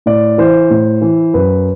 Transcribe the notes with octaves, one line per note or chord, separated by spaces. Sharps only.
A2 D5
E3 C5
A2
E3
F#2 B4